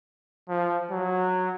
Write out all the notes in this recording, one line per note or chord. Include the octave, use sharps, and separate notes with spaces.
F3
F#3